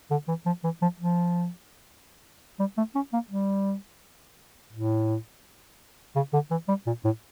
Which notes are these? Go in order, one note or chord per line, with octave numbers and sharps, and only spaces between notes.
D3
E3
F3
E3
F3
F3
G3
A3
C#4
A#3
G3
A2
C#3
D3
E3
G3
A#2
A2